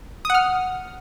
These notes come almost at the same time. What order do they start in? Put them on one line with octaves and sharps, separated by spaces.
D#6 F#5 F6